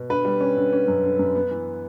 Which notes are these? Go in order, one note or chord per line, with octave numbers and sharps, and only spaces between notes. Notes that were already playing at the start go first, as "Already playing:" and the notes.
Already playing: B2
D3 B4
G3
C#4
D3
C#4
F#2
D3
F#2
B3
E3